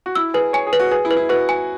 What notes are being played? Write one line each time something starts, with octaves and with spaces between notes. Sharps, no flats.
F#4
E4 E6
G#4 B4
C#5 G#5
G#4
B4
F#4
G#4 B4
E4
B4
E4
F#4 B4
G#5